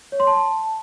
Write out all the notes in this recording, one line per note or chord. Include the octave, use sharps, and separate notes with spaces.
C#5
C6
A5